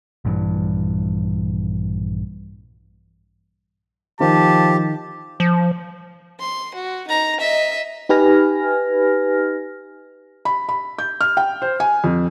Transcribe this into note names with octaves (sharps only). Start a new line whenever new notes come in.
A#1 G2 E3
D#3 F3 G4 A5
F3
C6
F#4
D#4 A#5
D#5 E5
D#4 G4 B4 G#5 F6 A#6
B5
B5
G6
F6
G5
C5
G#5
F2